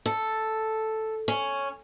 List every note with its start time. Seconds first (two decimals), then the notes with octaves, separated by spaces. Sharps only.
0.06 A4
1.28 C#4